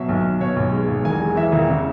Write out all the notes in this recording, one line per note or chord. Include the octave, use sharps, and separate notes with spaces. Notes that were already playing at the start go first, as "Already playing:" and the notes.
Already playing: B2 F#3 E5
B1
B1
B2 C#5
B1
G#3
B1
E1 G#5
G#3
E3 E5
E1
C#3